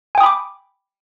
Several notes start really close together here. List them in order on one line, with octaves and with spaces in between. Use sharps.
G#5 G5 D#6 B5 D6